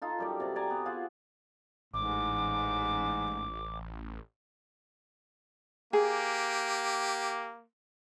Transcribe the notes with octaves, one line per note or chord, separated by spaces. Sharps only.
D#4 F4 A4
F#2 G3 D5
C3 D5
D5 G#5 A#5
B3
F4 G#4 C5 F#5
A1 G#2 D6
A#3 G4 G#4